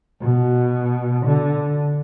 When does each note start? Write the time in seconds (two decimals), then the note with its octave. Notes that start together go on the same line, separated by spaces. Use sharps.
0.22 B2
1.26 D3